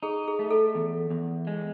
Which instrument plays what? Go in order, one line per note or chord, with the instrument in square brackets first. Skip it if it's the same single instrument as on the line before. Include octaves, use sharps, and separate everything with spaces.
[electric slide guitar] D#4 [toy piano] G#4
[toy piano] G#4
[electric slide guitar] A3
[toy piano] A4
[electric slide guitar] E2
E2
G#3